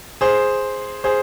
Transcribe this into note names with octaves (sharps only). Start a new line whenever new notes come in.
G#4 C5
G#4 C5